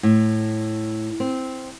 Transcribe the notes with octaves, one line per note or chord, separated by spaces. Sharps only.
A2
C4